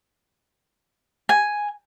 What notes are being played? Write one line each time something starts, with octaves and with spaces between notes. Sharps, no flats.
G#5